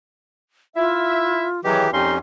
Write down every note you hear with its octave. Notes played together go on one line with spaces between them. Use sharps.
E4 F4 E5
B2 D#3 E3 F#3 G4 G#4
F2 A#2 C#4 D#4 G4 C6